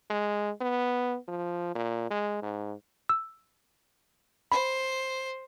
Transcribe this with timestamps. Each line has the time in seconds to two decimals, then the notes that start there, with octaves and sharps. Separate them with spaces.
0.10 G#3
0.61 B3
1.28 F3
1.75 A#2
2.10 G#3
2.42 G#2
3.09 E6
4.52 C5 B5